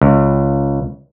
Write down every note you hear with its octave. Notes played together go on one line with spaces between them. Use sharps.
C#2